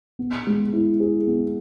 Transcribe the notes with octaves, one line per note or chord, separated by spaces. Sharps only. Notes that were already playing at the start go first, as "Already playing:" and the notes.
B3
G#3
E4
G#4
B3